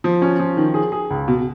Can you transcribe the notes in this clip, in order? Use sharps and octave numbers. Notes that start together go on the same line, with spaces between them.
F3
C#4
F3
D#3
G#4
G#4
C#2
B2